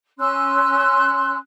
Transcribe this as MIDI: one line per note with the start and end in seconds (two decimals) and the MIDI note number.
0.19 1.36 61
0.19 1.36 84
0.19 1.36 88
0.19 1.36 90